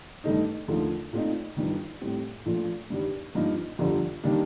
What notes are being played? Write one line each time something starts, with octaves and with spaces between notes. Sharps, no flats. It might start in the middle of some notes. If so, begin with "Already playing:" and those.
G2 D#3 A3 D#4
D#2 D3 F3 A3
A#2 A3 C4 D#4
G1 G2 D#3
A2 G3 C4
A#1 A#2 F3 A3
G2 D#3 G3
G2 F3 A#3 D#4
G1 F2 D3 G3
D#3 G3 A#3 D4